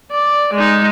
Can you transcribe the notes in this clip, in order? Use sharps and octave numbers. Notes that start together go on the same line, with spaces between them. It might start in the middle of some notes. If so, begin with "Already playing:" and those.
D5
G#3 D#4